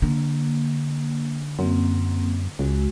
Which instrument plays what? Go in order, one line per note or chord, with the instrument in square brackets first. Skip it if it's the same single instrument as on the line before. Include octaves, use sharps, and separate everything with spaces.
[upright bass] D3 [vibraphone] A#3
[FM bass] F#2 [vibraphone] F#3 A#3 C4
[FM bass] C#2 [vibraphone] G#3 F#4